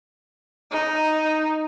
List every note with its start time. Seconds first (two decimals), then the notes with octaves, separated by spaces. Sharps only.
0.71 D#4